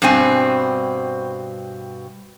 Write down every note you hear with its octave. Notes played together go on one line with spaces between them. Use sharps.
G2 B2 C4 G#5